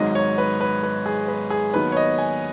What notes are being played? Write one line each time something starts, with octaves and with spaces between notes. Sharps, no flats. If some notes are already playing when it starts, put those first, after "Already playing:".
Already playing: G#1 G#2 D#3 F#3 D#5
C#5
B4
B4
B4
G#4
B4
G#4
D#2 D#3 F#3 B3 B4
C#5
D#5
G#5